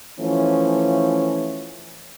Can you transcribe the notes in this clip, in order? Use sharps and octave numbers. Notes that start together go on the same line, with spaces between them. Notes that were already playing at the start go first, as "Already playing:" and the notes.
E3 F3 A3 C#4